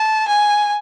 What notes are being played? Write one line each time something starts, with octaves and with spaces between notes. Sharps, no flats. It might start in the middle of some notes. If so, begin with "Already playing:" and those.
Already playing: A5
G#5